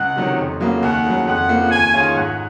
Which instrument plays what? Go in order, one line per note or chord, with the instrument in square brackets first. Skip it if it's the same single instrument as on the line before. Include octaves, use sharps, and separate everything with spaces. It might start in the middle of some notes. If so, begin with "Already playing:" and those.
Already playing: [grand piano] C#2 [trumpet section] F#5
[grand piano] C3 D#3 F#3 C#4
F2
C#3 F#3 A#3
[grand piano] D#2 [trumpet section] F#5
[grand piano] C#3 F#3
[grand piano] F2 [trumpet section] F#5
[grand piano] C#3 F3 A#3
[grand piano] D#2 [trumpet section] G#5
[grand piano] D#3 G#3 C#4 F4
[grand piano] G#2 [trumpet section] F#5